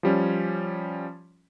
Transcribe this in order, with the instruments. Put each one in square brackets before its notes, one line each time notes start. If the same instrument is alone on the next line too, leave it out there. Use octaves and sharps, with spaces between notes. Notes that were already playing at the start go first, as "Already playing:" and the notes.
[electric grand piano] F3 G3 C#4